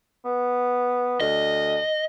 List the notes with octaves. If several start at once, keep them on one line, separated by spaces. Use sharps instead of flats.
B3
D2 D#5